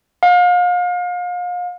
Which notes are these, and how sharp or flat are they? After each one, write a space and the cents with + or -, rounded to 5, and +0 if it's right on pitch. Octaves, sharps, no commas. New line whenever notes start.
F5 +35